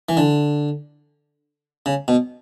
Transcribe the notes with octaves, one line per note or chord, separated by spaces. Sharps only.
E3
D3
C#3
B2